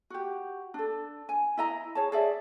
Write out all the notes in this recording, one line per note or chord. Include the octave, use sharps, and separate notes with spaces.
F#4 G4
D4 A4
G#5
E4 D#5 A#5
G#4 C#5 A5
G#4 D5 E5